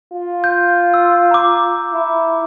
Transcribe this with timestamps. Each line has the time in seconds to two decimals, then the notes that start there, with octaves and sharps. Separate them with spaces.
0.12 F4
0.44 G6
0.94 E6
1.31 A#5 D6
1.93 E4